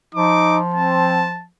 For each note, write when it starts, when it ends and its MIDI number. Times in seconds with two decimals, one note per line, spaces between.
0.15 1.48 53
0.15 0.59 63
0.15 0.60 86
0.74 1.25 60
0.74 1.44 81